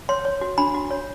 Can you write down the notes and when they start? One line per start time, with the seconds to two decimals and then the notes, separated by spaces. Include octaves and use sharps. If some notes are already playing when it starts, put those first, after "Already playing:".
0.09 C#5 C6
0.25 C#5
0.41 F#4
0.58 D4 B5
0.74 F#4
0.91 C#5